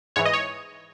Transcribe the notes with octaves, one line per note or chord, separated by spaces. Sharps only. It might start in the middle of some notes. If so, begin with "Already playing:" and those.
G#2 E3 C#5
D#5
C#5